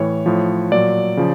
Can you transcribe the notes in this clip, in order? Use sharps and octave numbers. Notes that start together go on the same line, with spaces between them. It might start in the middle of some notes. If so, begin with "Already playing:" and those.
Already playing: A2 E3 C#5
A2 F3
A#2 F#3 D5
C#3 F3